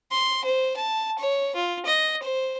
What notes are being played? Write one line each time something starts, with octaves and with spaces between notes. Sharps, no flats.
C6
C5
A5
C#5
F4
D#5
C5